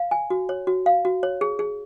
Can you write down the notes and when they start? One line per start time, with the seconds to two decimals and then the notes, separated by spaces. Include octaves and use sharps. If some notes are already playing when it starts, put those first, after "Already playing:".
Already playing: F5
0.11 G#5
0.30 F#4
0.49 C#5
0.67 F#4
0.86 F5
1.05 F#4
1.23 C#5
1.41 G#4
1.59 G#4